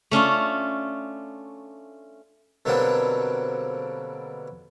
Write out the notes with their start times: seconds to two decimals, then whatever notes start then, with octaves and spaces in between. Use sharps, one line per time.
0.11 A3 C#4 D4 F4
2.65 B2 D3 F#3 G3 A#3 C4